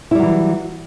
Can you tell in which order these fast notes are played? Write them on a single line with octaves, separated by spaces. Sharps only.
E4 G3 F#3 E3